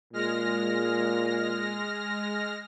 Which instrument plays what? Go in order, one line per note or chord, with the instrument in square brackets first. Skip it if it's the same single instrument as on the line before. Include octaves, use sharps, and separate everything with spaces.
[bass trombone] A#2 [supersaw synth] G#3 F6 A#6